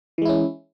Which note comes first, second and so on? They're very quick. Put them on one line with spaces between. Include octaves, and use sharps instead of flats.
E3 G#3 E4 C#4